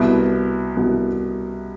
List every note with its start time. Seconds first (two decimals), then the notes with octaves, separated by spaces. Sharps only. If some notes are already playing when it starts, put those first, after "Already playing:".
Already playing: C2 B2 B3 E4
0.77 C2 B2 B3 E4